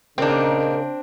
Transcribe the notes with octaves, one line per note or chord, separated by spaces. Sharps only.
A#2 C#3 A#3 C4 D4 D#4 A#4